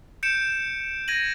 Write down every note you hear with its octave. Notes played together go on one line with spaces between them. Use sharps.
G6 C#7 D7 E7
G#6 A#6 D#7 F#7